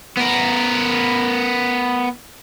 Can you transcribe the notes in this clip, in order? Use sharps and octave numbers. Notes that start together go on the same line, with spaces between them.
B3 A#4